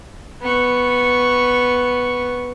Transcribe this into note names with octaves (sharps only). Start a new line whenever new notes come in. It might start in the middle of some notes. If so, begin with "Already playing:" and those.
B3 C#6